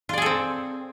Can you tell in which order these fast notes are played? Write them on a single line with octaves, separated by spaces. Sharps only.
F4 D5 G#4 A4 C4